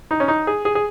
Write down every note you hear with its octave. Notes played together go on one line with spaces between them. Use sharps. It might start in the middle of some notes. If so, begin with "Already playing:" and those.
D#4
C#4
D#4
G#4
G#4
G#4